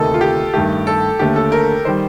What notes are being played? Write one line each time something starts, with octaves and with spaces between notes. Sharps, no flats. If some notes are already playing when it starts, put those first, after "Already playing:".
Already playing: D2 C3 D#3 A#3 D#4 A4
F4
G4
G2 D#3 A3 G4
A4
D#2 D3 A3 G4
A4
A#4
D#3 G3 C5